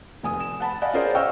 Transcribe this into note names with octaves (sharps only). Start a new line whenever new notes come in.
F1 G#5 D#6
E7
F#5 A5 B5
D5 D#5 F5 F#5 G#5 B5
C#4 F4 G#4 A#4 C5 D5
D#5 F5 G5 C#6 E6 F6